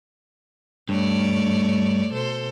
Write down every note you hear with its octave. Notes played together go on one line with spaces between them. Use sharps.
G2 A3 C#5 D5
B2 A4 C5